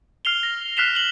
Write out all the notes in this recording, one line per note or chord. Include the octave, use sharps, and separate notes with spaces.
F6 C7 F7 G7
A#6
F6 F#6 B6 C7 E7 F7
F#7 G7